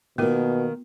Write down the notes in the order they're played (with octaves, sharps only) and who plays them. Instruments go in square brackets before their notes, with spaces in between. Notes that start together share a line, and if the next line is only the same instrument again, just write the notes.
[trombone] B2 [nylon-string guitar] D#3 A#3 [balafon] B3 F4